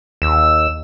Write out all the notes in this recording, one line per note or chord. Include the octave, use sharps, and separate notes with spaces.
D#2 E6